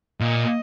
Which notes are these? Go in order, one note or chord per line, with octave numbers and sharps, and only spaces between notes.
A#2 D#5